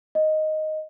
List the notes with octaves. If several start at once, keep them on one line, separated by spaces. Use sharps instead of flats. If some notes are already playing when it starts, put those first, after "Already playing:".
D#5